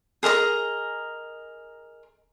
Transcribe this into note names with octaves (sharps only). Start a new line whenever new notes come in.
G#4 A#4 D#5 A#5